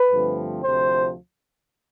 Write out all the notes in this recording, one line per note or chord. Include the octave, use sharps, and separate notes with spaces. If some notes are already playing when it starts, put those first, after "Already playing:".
Already playing: B4
G2 D3 F3 A3 C4
D2 C3 F3 C5